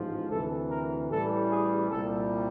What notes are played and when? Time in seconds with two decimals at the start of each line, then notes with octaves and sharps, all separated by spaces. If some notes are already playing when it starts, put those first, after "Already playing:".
Already playing: A1 G#2 F3
0.30 D2 C3 E3 A4
0.70 A#4
1.10 A1 A2 E3 G3 A4
1.51 G#4
1.90 C2 A#2 G3 A4